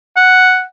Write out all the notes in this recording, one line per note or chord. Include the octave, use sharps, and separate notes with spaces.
F#5